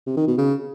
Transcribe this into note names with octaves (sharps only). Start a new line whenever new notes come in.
C3
D#3
B2
C#3